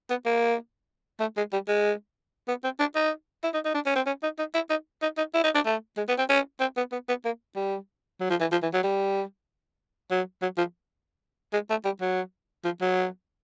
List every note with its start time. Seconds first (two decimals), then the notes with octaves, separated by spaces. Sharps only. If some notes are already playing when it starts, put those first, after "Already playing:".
0.10 B3
0.26 A#3
1.20 A3
1.37 G#3
1.53 G3
1.68 G#3
2.48 B3
2.64 C4
2.80 D4
2.95 D#4
3.44 E4
3.54 D#4
3.65 D#4
3.74 D4
3.86 C#4
3.96 C4
4.07 C#4
4.23 D#4
4.39 D#4
4.54 E4
4.70 D#4
5.02 D#4
5.18 D#4
5.34 E4
5.44 D#4
5.55 D4
5.66 A3
5.97 G#3
6.08 B3
6.18 C4
6.29 C#4
6.60 C4
6.77 B3
6.92 B3
7.09 B3
7.25 A#3
7.56 G3
8.20 F#3
8.30 F3
8.40 E3
8.52 F3
8.63 E3
8.73 F#3
8.84 G3
10.11 F#3
10.42 F#3
10.58 F3
11.53 G#3
11.70 A3
11.85 G3
12.01 F#3
12.65 F3
12.81 F#3